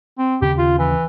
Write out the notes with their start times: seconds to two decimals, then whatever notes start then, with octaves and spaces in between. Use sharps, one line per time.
0.18 C4
0.42 D#2 C#3 C#4 G4
0.58 F4
0.79 E3